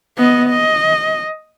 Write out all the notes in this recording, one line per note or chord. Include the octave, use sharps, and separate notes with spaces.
B3 D#5
D#5